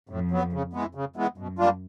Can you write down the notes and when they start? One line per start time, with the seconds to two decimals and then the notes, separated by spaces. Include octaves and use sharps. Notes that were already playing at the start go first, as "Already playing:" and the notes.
0.09 F2 A2
0.31 F#3 B3
0.53 C#3
0.73 E3 G#3 B3
0.95 C#3
1.16 E3 G#3 B3
1.38 F#2 B2
1.59 G3 A#3 D4 F4